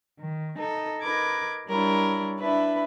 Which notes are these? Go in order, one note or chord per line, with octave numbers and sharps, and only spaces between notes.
D#3
D#4 A4
D#4 A#4 B4 D6 G#6
G3 D4 E4 A#4 C#5
D4 E4 B4 E5